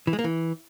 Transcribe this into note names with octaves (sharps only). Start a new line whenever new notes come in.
E3
G#3
A#3
E3